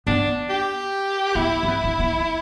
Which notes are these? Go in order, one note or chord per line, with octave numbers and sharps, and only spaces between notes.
B3 D4
G4
B3 E4
D4
B3
D4
B3